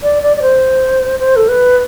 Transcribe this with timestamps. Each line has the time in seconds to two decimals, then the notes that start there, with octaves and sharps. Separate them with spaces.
0.03 D5
0.23 D5
0.37 D5
0.42 C5
1.19 C5
1.36 A4
1.48 B4